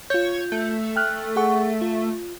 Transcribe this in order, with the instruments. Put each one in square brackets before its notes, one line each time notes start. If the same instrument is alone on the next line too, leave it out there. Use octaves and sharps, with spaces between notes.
[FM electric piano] F4 G6 [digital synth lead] C#5
[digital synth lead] A3
[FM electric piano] G5 F6 F#6
G#4 F#5 C#6
F4